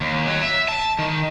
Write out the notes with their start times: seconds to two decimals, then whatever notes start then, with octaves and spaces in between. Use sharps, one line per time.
0.01 D#2
0.27 F#3
0.42 E5
0.68 A5
0.99 D#3